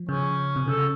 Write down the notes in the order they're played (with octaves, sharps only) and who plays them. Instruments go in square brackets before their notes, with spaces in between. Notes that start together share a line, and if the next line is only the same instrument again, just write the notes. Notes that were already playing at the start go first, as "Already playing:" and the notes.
Already playing: [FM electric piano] F3
[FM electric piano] C#3 [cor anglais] C#4
[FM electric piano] C3
[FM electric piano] C#3 [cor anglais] A4